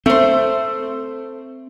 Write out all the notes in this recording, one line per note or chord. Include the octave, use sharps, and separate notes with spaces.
A3 C4 C5